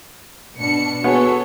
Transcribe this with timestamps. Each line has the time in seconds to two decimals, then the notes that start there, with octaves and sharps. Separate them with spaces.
0.59 B2 D4 C#7
1.04 B3 F#4 G#4 A4 C#5